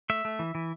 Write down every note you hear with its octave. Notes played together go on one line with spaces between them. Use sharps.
A3 E5
A3
E3
E3